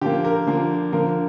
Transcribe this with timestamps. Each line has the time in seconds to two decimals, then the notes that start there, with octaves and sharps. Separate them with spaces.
0.01 D3 F3 A#3 G4
0.25 A#4
0.47 D3 F3 A#3
0.92 D3 F3 A#3 A#4